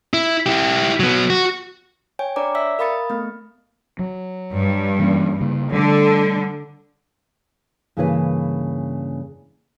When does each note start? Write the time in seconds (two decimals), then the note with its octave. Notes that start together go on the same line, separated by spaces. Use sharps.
0.14 E4
0.46 E4 G4
1.00 F#3 B3
1.30 F#4
2.19 C#5 G5 G#5
2.36 D4 B4 C#5 D5 A#5 D6
2.55 D5 E5 E6 B6
2.79 A#4 F5 B5 D#6 A6 C#7
3.10 A3 B3
3.99 F#3
4.56 G2
4.99 E3 A#3 C#4
5.41 C#3 A#3
5.73 D3 G3 A3
7.97 G2 C#3 E3 A#3 G#4 B4